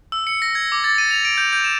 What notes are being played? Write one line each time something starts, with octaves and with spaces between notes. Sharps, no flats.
E6
C#7
A#6
G#6
D6
A6
D#7
F7
D7
G6
G6
E7